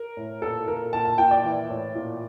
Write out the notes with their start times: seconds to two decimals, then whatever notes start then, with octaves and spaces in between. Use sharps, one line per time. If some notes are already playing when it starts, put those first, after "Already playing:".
Already playing: A#4
0.17 A2
0.41 A#2 A4
0.68 A#2 A#4
0.93 A#2 A5
1.05 A5
1.18 A#2 G5
1.31 D5
1.44 E3
1.70 A2
1.95 A#2